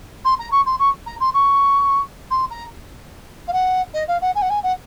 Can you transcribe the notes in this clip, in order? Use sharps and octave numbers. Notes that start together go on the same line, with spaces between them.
C6
A#5
C#6
C6
C#6
A#5
C6
C#6
C6
A#5
F5
F#5
D#5
F5
F#5
G#5
F#5
G#5
F#5